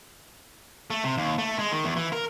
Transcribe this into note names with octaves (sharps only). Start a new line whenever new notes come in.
A3
C3
D#2
A3
G#3
D#3
E2
E3
A#4